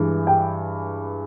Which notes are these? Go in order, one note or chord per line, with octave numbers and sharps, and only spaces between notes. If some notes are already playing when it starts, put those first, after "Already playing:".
Already playing: G2 E3 G#3
G5